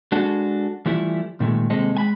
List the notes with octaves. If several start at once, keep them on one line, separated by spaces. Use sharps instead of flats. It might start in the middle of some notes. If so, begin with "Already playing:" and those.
G#3 D4 F#4 A4
E3 F3 G3 A3 E4
A#2 D#3 G#3 A3
D#2 C3 G#3 C4 A4 D#5
G#3 G#5 B5